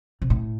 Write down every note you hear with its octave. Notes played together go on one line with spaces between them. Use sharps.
C3
A2